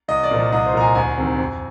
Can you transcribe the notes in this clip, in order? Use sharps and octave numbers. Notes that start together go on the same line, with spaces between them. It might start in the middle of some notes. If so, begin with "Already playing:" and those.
C2 D#5
D5
A#2 F3
C2 D#5
C5
A#2 F3 A#5
G#5
D2 G#5
C3 D#3
F2